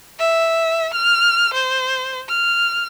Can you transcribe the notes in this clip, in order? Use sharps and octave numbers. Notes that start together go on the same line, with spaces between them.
E5
F6
C5
F6